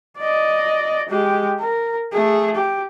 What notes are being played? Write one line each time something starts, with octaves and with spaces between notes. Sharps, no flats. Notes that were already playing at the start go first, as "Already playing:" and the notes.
D5 D#5
G#3 G4
A#4
A3 G#4
G4